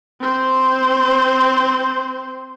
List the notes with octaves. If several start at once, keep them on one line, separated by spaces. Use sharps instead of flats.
C4 C5